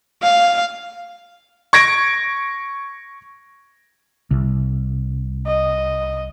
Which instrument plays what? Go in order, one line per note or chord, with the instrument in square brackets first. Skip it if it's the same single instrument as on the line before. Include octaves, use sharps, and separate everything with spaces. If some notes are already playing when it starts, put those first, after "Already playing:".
[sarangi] F5
[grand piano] C#6 G#6 A#6 D7
[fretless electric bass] C2
[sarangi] D#5